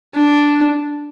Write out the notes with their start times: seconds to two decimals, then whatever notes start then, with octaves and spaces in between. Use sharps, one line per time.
0.16 D4